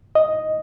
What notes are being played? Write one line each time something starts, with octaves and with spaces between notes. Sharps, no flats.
D#5